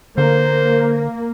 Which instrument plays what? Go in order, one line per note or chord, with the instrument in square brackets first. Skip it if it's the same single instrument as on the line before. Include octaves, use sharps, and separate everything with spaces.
[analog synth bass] D3 [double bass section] A#3 [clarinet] C5